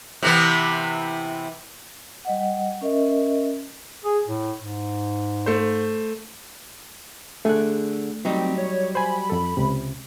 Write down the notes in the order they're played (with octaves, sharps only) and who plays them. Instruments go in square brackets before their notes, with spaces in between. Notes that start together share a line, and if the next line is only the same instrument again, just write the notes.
[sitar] C3 E3 B3
[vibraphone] G3 D#5 F#5
C#4 A#4 D#5 E5
[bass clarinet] G#4
A2
G#2
[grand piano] A3 C5
[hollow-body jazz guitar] D3 G#4 [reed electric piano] A3 F#6
[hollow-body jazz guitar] F#3 G3 D#4 [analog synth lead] C4
[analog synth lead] C#5
[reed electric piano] C5 G#5 [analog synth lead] B5
[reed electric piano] F2 A4
C#2 C3